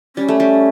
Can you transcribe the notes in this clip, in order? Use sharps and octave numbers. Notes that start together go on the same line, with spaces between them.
G3 C#4
A3
G3